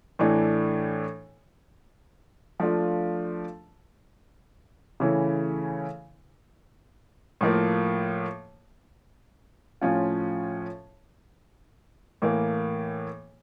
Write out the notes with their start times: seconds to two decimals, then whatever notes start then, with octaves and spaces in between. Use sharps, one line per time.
0.19 A2 E3 A3 D4
2.60 F3 A3 D4 F4
5.00 C#3 E3 A3 C#4 E4
7.41 A2 F3 A#3
9.81 A2 F3 C#4 F4
12.22 A2 E3 A#3